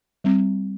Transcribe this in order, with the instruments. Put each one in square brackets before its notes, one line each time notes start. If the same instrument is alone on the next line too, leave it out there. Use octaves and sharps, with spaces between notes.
[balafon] G3 C4